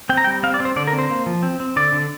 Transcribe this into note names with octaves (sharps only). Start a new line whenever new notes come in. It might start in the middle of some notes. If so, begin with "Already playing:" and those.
C4 G5
A#5
G3 G5
C4 F5
D5
C4
C5
D3 D5
A#4
C4
C5
A#3
F3
C4
C4
D3 D5
D3